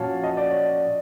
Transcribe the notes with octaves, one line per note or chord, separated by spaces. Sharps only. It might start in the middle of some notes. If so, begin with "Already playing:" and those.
Already playing: A#2 F3 C#4 F#4 F5 A5
D#5
D5
C#5
D5